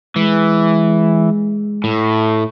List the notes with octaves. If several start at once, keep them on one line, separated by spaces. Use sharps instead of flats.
E3 G#3
A2